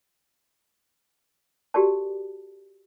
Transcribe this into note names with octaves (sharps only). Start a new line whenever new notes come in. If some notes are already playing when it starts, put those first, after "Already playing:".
F#4 G4 A4 A#4 D5 A5